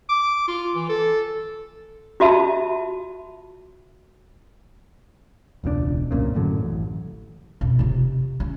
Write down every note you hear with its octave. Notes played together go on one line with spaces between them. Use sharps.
D6
F4
E3
A4
F4 F#4 E5 A5 B5
E1 C#2 B2 D4
C2 F#2 A#2 C#3
F#2 A2 D3 F#3
A1
F2 B2
C3 F4
C#4